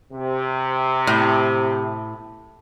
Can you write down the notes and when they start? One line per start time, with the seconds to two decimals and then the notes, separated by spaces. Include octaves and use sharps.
0.13 C3
1.07 A2